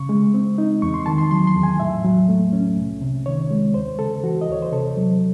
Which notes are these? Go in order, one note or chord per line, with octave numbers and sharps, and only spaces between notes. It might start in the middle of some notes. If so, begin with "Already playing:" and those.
Already playing: C#3 C#6
G#3
C4
D#4
E2 C#6
C6
D#3 A5
C6
F#3 C6
C6
E2
G#5
A2 E5
F#3
A3
C#4
C2
C3
D#3 C#5
G#3
D#2 C5
C#3 A4
E3 F#4
D#5
D#2 C#5
C5
C3 A4
F#3